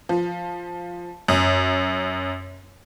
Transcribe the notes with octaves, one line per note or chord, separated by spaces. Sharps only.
F3
F#2